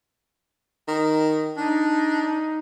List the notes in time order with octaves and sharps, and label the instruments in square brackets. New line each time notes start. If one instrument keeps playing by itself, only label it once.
[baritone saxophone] D#3
[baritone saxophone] D4 [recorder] D#4